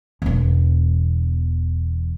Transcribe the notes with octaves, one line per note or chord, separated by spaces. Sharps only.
E1 E2